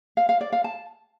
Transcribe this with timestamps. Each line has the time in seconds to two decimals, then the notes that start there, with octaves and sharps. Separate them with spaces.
0.17 F5
0.29 F5
0.41 D5
0.52 F5
0.64 A5